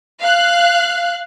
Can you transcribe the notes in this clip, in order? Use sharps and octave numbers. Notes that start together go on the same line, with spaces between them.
F5 F#6